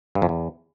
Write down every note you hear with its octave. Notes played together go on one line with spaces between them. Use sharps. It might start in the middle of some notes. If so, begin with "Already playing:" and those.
G2
F2
E2